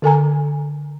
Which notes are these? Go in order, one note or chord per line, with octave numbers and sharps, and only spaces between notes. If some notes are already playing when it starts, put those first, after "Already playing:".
D3 A4 G#5 A#5